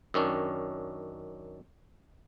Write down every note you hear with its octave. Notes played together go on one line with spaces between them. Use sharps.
F#2 D#3 C#4 D4